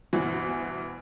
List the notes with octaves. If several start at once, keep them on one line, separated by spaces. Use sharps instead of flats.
D2 G2 B2 E3